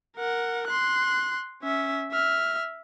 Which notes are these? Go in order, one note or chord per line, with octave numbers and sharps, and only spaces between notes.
A#4 F#5
C6 F#6
C#4 E5
E5 F6